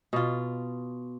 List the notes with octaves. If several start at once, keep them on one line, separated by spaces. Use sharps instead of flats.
B2 F4